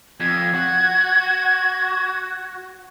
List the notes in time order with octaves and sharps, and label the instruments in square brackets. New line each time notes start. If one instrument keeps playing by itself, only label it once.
[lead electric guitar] F2 [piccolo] G#6
[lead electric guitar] F#4